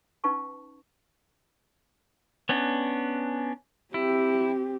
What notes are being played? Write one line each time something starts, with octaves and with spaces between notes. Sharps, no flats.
C#4 D#4 B4 F5 A5 C#6
B3 C#4 D4
C4 E4 G4